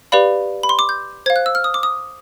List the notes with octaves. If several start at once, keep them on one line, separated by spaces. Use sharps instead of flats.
G4 B4 D5 F5 B5
B5
C6
D6
G6
C5 F5 G#6
F#6
E6
F6
D#6
D6
D#6